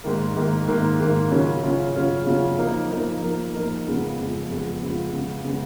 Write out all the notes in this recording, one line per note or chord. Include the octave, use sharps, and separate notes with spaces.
G#2 D#3 A#3
G#2 D#3 A#3
G#2 D#3 A#3
G#2 D#3 A#3
C#3 F#3 C#4 F4
C#3 F#3 C#4 F4
C#3 F#3 C#4 F4
C#3 F#3 C#4 F4
F3 A#3 D#4 A#4
F3 A#3 D#4 A#4
F3 A#3 D#4 A#4
F3 A#3 D#4 A#4
F2 C#3 G#3 B3 F4
F2 C#3 G#3 B3 F4
F2 C#3 G#3 B3 F4
F2 C#3 G#3 B3 F4
C#3 G#3 B3
C#3 G#3 B3